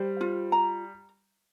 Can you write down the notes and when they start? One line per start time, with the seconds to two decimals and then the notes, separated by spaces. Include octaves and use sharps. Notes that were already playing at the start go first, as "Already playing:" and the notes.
Already playing: G3 C5
0.21 F4
0.52 A#5